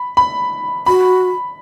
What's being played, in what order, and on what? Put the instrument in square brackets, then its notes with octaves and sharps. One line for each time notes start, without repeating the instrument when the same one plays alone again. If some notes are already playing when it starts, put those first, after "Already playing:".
Already playing: [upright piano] B5
B5
[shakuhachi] F#4 [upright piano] B5